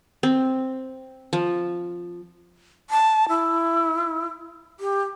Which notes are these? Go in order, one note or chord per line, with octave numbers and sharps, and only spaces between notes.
C4
F3
A5
E4
G4